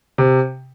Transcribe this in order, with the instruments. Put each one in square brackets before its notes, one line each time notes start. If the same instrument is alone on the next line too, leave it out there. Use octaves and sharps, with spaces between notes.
[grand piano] C3